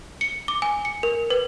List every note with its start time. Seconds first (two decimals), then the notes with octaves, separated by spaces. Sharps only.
0.21 C#7
0.48 D6
0.62 G#5
0.85 C#7
1.03 A#4
1.30 B4